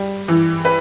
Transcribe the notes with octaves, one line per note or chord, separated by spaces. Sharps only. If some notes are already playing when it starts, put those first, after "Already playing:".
Already playing: G3
E3
B4